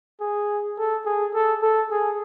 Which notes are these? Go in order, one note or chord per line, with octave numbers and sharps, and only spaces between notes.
G#4
A4
G#4
A4
A4
G#4